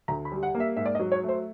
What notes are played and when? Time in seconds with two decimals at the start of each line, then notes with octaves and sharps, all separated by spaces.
0.08 D2 A#5
0.25 B5
0.32 G3
0.43 F#5
0.55 A#3
0.60 E5
0.76 G#2 E5
0.86 D5
0.95 D#5
0.99 F#3
1.12 C#5
1.23 A3
1.29 C5